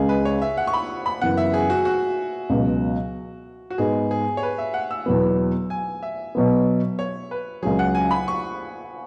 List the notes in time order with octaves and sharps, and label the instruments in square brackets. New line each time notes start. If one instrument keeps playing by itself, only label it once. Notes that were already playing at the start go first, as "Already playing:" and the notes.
Already playing: [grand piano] C#2 C#3 G#3 [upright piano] G#4
[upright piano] B4
C#5
E5
F#5
C#6
B5
B5
[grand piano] F#2 C#3 E3 B3 [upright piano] F#5
[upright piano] E5
G#4
F#4
F#4
[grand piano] C#2 B2 F#3
[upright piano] F#4
[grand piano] G#2 G#3 B3 [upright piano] G#4
[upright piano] G#4
C#5
B4
E5
F#5
E6
[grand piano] E2 B2 F#3 B3
[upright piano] G#5
E5
[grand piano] B2 F#3 B3
[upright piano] C#5
B4
[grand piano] C#2 C#3 F#3 [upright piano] G#4
[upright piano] F#5
G#5
B5
C#6